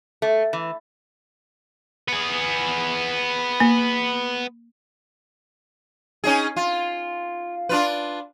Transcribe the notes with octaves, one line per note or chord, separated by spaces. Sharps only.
A3
E3
B3 G#4
A#3
C#4 D#4 G#4
F4
D4 F4 B4